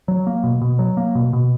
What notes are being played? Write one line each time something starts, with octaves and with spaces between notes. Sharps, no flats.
F#3
A#3
B2
B2
F#3
A#3
B2
B2